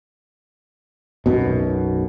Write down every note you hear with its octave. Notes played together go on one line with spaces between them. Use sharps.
B1 F#2 B2